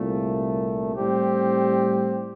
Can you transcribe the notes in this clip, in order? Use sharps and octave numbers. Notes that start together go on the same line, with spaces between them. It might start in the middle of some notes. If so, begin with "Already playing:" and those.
Already playing: C2 A#2 A3
A2 G3 C4 G4